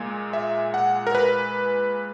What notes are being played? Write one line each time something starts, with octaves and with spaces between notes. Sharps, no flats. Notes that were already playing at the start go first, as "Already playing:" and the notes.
Already playing: A#2 G#3
E5
F#5
A#4
B4